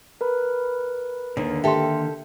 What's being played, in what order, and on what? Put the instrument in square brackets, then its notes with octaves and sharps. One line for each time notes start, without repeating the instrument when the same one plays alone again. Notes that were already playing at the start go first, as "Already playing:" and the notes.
[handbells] A#4 B4 B5
[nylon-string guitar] D#2 [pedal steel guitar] D3 D#3 A#3
[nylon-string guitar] G4 A4 [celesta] E5 C6